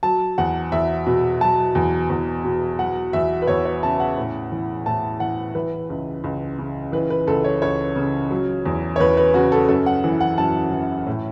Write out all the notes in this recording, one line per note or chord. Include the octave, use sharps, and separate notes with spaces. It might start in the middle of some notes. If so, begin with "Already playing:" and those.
F#3 A5
E2 F#5
E2 E5
B2
F#3 A5
E2
E2
B2
F#3 F#5
E2 E5
B4
E2 C#5
C#5
C#3 A5
F#5
A2
E3
A2 A5
E3 F#5
E3 B4
C#2
C#2
C#3
E3 B4
B4
C#2 A4
C#5
C#2 C#5
C#3
F#3
E2
C#5
E2 B4
B4
C#3 F#4
A4
F#2 A4
F#5
E3
F#5
F#2 A5
E3
A2